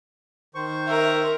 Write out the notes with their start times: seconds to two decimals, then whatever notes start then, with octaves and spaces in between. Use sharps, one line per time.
0.55 D#3 C5 C#6
0.87 A#4 E5